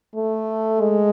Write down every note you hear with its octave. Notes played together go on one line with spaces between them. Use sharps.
A3
G#3